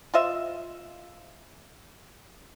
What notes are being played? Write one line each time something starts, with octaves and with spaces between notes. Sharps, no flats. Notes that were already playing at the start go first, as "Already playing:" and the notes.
F4 C5 D#5 E5